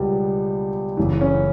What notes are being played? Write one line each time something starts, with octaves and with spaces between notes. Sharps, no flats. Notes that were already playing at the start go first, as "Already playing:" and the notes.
Already playing: C#2 B2 F#3 G3 B3 G4
F#1 F#2 E3
C#4